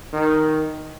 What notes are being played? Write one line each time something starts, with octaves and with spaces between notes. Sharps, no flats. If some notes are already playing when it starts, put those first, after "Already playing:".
D#3